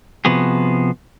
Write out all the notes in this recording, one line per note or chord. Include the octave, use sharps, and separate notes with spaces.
C3 F3 B3 F#4 G#4